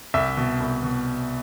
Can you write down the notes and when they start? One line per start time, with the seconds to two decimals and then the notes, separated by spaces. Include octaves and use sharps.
0.14 C2 E5
0.37 B2
0.60 C2
0.83 B2